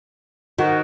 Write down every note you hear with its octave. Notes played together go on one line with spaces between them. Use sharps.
D#3 F#4